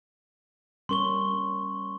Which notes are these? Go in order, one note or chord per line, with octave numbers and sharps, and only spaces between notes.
G3 C#4 A#4 C6 C#6 G7